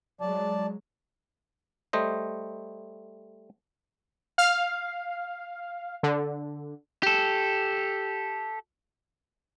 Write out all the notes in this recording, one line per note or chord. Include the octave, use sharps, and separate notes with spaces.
F#3 G#3 D5 A5
G3 A3 C5 D#5
F5
D3
G4 A4